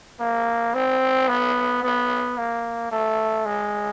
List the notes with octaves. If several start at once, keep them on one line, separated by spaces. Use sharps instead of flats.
A#3
C4
B3
B3
A#3
A3
G#3